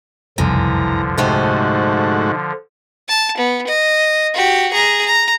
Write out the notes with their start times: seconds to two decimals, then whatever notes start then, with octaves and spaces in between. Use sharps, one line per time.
0.38 F#1 C2 F2 D3 E3 F3 A#5
1.18 G#2 C3 A3 D#4 F#4 C5
3.08 A5
3.37 B3
3.67 D#5
4.34 F#4 G4
4.72 G#4 A#5
5.05 A#5